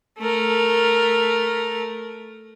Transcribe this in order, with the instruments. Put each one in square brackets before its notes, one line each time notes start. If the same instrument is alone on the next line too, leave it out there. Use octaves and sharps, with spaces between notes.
[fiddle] A3 A#4